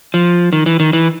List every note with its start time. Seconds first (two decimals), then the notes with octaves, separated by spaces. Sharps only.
0.14 F3
0.53 D#3
0.66 E3
0.80 D#3
0.93 E3